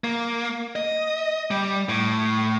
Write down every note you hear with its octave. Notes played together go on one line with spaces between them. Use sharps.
A#3
D#5
G3
A2